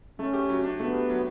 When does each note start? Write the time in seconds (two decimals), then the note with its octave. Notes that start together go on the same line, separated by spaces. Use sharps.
0.19 A3 C#4
0.33 G4
0.49 F#3
0.64 D4
0.79 A3 B3
0.94 G4
1.09 F#3